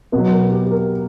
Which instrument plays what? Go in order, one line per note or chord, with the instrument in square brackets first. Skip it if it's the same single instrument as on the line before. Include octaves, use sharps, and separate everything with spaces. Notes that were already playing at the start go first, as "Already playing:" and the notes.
[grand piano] B2 F#3 B4
A#4
G4
G4
A#4